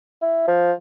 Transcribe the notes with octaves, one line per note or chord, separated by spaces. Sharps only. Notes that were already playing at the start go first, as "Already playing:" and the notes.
E4
F3